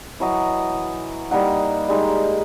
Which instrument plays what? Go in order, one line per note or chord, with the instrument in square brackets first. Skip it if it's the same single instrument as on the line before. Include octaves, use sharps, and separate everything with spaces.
[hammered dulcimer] E3 F#3 D#5
G3 A#3 D#4 F#5
G3 G#3 D#4